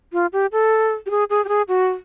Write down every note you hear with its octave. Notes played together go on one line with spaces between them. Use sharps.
F4
G4
A4
G4
G#4
G#4
G4
G#4
F#4